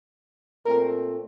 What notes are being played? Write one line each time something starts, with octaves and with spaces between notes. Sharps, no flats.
A#2 A3 C4 A#4